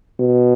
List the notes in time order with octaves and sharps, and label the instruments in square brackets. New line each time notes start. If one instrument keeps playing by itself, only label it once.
[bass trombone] B2